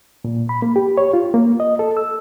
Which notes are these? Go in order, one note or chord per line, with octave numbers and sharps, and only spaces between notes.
A#2
B5
A#3
G4
C#5
F4
A#3
D#5
A4
E6